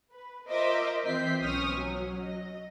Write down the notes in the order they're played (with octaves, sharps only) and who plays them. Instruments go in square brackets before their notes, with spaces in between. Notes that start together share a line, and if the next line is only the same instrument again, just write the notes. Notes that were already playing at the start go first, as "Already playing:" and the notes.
[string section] B4
F4 A#4 C5 D#5 E5 D6
E3 C4 F4 G6 B6 C7
B1 C4 C#4 C#6 D#6 F6
F#3
D#5